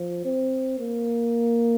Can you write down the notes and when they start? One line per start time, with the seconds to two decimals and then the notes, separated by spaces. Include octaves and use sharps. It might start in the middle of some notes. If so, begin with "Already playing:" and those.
Already playing: F3
0.25 C4
0.79 A#3